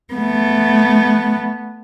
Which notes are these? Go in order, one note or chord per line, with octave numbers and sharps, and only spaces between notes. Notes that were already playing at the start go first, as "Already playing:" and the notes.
A3 B3